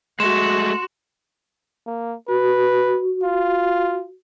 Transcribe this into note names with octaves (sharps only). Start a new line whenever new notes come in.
G#3 A3 F#4 C6 E7
A#3
F#4 B4
F4